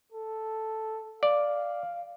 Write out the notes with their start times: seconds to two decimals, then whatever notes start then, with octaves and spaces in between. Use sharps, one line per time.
0.12 A4
1.23 D5 F5